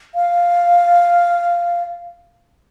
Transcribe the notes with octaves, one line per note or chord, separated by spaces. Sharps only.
F5